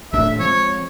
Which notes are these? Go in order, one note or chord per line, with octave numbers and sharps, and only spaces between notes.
D#1 A2 D4 E5
F3 G#3 C4 C#5